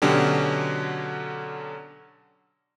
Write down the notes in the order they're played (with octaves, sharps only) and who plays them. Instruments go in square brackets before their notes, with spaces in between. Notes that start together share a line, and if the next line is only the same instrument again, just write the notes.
[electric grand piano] B2 D3 F#3 C#4 D4 G4